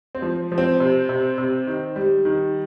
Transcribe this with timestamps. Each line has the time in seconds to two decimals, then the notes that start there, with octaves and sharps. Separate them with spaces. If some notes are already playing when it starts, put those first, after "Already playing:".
0.15 C4
0.22 F3
0.52 F3
0.58 C4
0.80 C3
1.09 C3
1.38 C3
1.67 D#3
1.96 G3
2.25 D#3